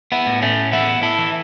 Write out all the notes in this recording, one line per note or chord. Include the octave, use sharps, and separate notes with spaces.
B3 E4
A2
A3 C#4
E3 B3 E4
E4 A4
E3